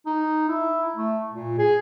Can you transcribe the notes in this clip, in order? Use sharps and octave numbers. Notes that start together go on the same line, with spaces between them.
D#4
E4
A3
A#2
G#4